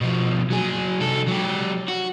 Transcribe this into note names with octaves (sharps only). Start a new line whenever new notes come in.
B2 F3
F#3 G#4
C2 A4
F#3 G4
F#4